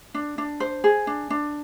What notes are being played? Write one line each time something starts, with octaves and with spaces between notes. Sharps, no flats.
D4
D4
C5
G#4
D4
D4